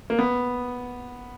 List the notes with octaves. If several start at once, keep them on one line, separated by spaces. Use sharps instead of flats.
A#3
B3